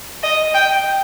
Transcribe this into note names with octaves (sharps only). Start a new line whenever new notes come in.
D#5
G5